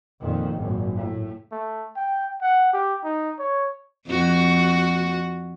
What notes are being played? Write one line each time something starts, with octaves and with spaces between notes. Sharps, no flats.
F2 A#2 D#3
G#1 F#2 A#2
A2
A3
G5
F#5
G4
D#4
C#5
F2 F#4